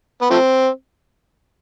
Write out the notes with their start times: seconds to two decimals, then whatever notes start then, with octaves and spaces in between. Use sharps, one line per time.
0.22 B3
0.30 F3 A3 C4